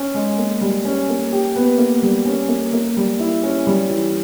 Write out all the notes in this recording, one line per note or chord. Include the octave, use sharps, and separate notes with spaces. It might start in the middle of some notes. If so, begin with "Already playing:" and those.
Already playing: C#4
G#3
A#3
G3
C#4
A#3
G4
B3
A#3
G3
C#4
A#3
A#3
G3
E4
C#4
G3
E3